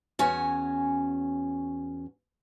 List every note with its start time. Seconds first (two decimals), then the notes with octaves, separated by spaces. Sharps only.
0.19 E2 C#4 F#4 C#5 G#5